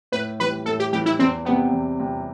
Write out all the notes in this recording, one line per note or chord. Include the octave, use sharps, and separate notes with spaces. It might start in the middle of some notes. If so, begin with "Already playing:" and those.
A2 B4
E3 G3 B4
A2 A4
G4
E3 G3 G4
E4
E2 C4
C3 G3 B3 C4
E2
C3 G3 C4